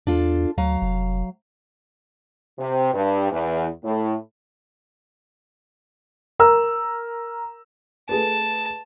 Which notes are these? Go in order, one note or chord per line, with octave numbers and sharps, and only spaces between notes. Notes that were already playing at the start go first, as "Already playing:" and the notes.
E2 D4 F4 A4
D2 F#3 F5 A#5
F1
C3
G2
E2
A2
A#4 A#5 E6
A3 G#4 B4 A5